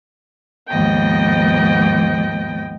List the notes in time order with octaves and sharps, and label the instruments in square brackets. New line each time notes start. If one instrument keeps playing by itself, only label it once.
[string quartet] D#2 G#2 F3 B3 D#5 G5